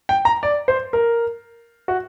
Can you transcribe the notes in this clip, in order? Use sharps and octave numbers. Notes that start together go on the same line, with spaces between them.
G5
A#5
D5
C5
A#4
F#4